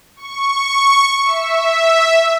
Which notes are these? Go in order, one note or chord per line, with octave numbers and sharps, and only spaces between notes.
C#6
E5